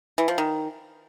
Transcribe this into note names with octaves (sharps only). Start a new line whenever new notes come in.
E3
F3
D#3